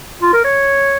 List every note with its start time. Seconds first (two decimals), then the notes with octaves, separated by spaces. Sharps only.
0.22 F4
0.33 A#4
0.45 C#5